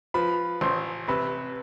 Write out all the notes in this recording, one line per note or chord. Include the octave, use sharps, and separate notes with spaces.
F3 B4 B5
A1 C5 C6
C3 B4 B5